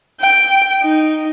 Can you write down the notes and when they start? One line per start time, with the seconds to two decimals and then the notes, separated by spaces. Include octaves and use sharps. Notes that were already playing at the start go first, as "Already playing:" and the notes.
0.21 G5
0.82 D#4